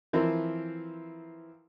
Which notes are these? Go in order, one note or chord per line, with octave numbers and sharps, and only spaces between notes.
E3 F3 C4 E4 A#4